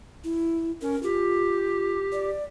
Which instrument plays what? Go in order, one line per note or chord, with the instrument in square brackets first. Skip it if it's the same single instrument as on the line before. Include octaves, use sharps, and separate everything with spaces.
[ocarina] E4
[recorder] C#4 [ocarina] A#4
[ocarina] F4 [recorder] G4
[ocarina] D5